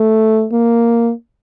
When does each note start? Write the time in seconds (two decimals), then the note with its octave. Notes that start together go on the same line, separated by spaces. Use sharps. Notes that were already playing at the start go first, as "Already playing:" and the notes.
Already playing: A3
0.52 A#3